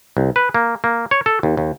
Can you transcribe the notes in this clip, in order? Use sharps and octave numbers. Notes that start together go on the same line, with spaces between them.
C2
B4
A#3
A#3
C#5
A4
D#2
D#2